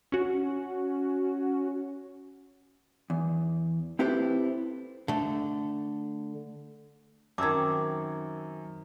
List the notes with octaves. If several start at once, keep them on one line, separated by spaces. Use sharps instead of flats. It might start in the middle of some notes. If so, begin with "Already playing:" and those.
C#4 F#4
E2
C4 E4 G4 A4 B4 C5
D3 A3
F#2 D#3 C4 A5 D6 E6 G#6